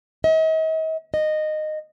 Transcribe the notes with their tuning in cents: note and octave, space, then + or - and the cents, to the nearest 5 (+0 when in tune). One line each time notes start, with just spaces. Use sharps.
D#5 +40
D#5 -15